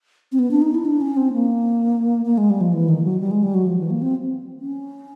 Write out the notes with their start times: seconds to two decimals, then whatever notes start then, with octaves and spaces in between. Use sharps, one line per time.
0.32 C4
0.39 B3
0.51 D4
0.62 D#4
0.74 E4
0.85 D4
1.01 C#4
1.17 C4
1.33 A#3
2.26 A#3
2.38 G#3
2.50 G3
2.61 F3
2.73 E3
2.88 D#3
3.04 F#3
3.20 G3
3.31 G#3
3.43 G3
3.54 F#3
3.67 F3
3.79 E3
3.90 A#3
4.02 C4
4.60 C#4